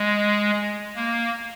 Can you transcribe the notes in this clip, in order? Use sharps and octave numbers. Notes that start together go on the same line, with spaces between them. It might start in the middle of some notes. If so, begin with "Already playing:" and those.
Already playing: G#3
A#3